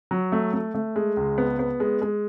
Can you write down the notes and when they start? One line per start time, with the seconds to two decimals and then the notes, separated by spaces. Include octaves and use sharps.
0.11 F#3
0.32 A3
0.53 A3
0.75 A3
0.96 G#3
1.17 C#2
1.38 B3
1.59 B3
1.80 G#3
2.02 G#3